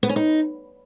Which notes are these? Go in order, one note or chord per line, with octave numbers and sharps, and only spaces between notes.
B3
C#4
D#4